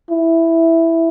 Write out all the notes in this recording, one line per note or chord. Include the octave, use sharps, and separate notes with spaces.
E4